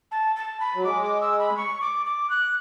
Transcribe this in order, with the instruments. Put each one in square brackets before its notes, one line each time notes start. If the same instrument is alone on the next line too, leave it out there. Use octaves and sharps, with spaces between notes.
[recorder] A5
A5
B5
[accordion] F#3
[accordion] G#3 [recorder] D6
[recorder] D6
E6
B5
C#6
D6
D6
F#6